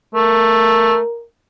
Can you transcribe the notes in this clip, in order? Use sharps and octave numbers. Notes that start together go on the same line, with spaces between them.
A3 A#4